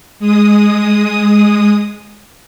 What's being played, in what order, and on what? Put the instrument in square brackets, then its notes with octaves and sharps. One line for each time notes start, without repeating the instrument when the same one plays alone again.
[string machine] G#3 D#6